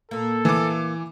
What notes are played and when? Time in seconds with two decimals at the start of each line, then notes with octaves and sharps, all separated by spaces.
0.11 A#2 A#3 A4
0.45 E3 D6